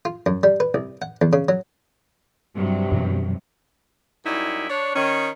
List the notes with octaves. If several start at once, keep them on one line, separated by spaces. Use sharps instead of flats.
F4
F#2
G3
B4
C2
F#5
E2
C#3
F#3
G2 C3 F#3
F#2 B2 E3
F#2 G3 D#4 E4
D4 C#5
D#3 C#4